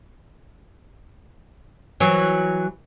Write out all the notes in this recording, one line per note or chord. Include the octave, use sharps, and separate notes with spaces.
E3 F#3